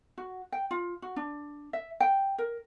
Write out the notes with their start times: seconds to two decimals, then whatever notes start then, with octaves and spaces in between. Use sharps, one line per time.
0.18 F#4
0.52 G5
0.71 F4
1.02 F#4
1.16 D4
1.73 E5
2.00 G5
2.38 A#4